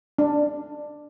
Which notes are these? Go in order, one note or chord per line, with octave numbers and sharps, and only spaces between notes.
D4